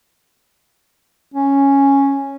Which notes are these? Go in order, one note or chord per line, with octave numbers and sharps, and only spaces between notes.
C#4